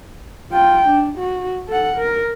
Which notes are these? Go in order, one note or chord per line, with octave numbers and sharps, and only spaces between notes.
F4 G5
D4
F#4
A4 F#5
A#4